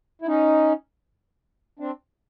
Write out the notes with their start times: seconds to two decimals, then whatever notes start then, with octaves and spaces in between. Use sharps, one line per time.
0.22 E4
0.27 C#4 D#4
1.79 C4 D4